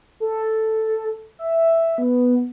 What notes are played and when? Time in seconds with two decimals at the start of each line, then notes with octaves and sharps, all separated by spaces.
0.20 A4
1.39 E5
1.98 B3